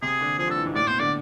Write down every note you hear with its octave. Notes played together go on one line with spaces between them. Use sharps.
C3 G#4
D3
F3 G#4
D3
A4
E3
G#2
A2 D5
B2 C5
D3 D5